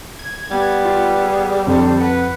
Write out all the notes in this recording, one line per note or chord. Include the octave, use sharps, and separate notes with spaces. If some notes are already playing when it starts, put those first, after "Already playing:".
G#6
G3 B3
F4
G#4
F2 D3 A4 C5
B4 F#5